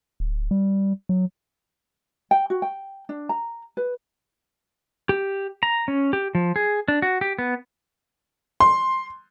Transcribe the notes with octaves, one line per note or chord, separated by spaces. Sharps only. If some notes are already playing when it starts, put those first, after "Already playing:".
D1
G3
F#3
G5
F#4
G5
D4
A#5
B4
G4
A#5
C#4
G4
F3
G#4
D4
F#4
G4
B3
C6